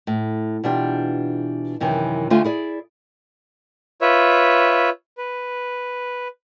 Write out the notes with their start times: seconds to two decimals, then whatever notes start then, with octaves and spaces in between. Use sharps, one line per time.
0.07 A2
0.64 B2 E3 D4 F4 G4
1.80 F#2 C3 D#3 E3
2.30 D2 D3 A3 F4 E5 G#5
2.44 E4 G#4 D5
4.01 F4 B4 C#5 E5
5.18 B4